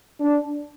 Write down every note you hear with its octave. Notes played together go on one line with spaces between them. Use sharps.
D4